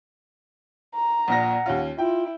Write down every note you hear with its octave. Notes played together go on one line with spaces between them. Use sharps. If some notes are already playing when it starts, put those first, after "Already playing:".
A#5
A#1 A#2 F#5 A#6
D#2 C#4 F4
E4 F4 G5